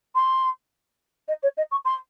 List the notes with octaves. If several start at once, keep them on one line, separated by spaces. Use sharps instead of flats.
C6
D#5
C#5
D#5
C#6
C6